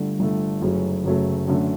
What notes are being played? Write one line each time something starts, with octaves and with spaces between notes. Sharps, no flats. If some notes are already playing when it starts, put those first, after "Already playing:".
Already playing: G1 G2 D3 A3
G1 G2 D3 A3
F#1 F#2 C#3 F#3 A3
F#1 F#2 C#3 F#3 A3
F#2 D3 A3